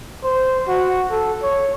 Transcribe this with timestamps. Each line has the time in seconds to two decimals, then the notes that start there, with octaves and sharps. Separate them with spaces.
0.24 C5
0.68 F#4
1.11 A4
1.43 C#5